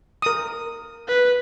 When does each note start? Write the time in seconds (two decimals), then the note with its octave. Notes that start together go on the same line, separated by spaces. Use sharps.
0.22 A#4 D#6
1.08 B4